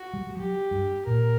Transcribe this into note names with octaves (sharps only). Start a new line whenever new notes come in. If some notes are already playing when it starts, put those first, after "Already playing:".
Already playing: F#4
G3
G3
F#3 G4
G2
A#2 A#4